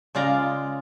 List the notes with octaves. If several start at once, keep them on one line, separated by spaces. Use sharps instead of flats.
C#3 G#3 F4 D5 A#5